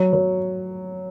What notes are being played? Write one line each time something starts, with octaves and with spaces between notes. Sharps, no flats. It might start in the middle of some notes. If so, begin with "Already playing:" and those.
Already playing: F#3
F#3